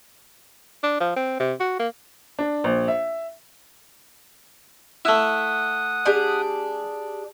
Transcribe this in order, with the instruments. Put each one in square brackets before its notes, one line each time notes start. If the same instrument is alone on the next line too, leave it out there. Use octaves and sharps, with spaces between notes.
[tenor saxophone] D4
F3
C4
C3
F#4
A#3
[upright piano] D4
A#1
E5
[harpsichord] A3 E4 [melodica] F#5 D#6
[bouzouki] D4 G4 G#4